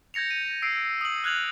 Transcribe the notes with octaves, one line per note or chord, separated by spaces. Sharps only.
G6 G#6 A#6 C#7 F7
D#7
E6 C7 D7
D#6 F#7
F6 F#6 G#6 F7 F#7